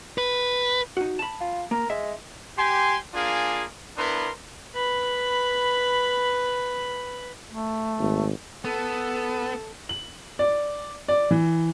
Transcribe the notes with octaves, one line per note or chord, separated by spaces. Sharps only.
B4
D#4 F#4
A5 B5
F4
A#3 A#4
G#3 E5
G4 G#5 C6
A#3 D4 F4 G#4 F5 G#5
B3 D4 E4 A#4 B4 C6
B4 B5
A3
G#1
B3 A4
F#7
D5
D5
E3